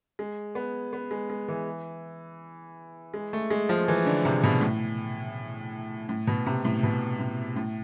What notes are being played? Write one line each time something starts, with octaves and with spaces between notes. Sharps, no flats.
G#3
B3
B3
G#3
G#3
E3
G#3
A3
G#3
F3
E3
D3
C3
B2
A2
A2
B2
C3
A2
B2
A2
A2